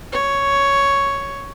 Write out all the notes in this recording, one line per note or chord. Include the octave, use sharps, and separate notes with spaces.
C#5